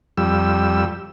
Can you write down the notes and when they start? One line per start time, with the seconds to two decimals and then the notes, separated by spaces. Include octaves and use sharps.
0.17 F2 G3 E6